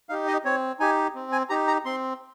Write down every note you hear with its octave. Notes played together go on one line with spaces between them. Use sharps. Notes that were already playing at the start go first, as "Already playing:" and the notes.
D#4 G4 F5
D#5
C4 C#5
D#4 G4 G#5
C4
G#5
D#4 G4 A#5
A#5
C4 C6